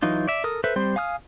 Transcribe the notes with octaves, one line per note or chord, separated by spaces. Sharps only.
E3 F#3 D#4 F4
D5 E5
A4 A#4 D#6
A4 B4 C5 E5
G3 C4 C5 C6
F5 G#5 D#6 F6